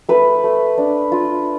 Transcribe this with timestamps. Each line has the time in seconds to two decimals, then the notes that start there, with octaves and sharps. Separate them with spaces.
0.09 A3 B4
0.44 A3
0.78 D4
1.12 F4